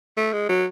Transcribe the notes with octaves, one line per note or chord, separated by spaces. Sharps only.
A3
G#3
F#3